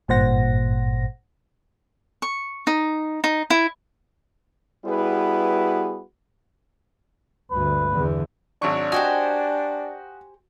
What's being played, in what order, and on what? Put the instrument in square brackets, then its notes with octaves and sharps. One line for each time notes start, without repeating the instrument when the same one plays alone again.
[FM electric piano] G#1 G2 A#2 C5 F#5 A#6
[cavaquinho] C#6
D#4
D#4
E4
[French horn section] G3 B3 E4 F#4 G#4 B4
[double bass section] D2 G2 [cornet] B4
[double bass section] E2 D3
[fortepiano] G#1 F#3 C#6 [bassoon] D4
[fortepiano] F#4 D#5 [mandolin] G4 C5 G#5